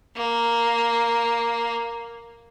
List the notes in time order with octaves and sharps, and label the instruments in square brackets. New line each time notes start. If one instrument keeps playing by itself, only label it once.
[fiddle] A#3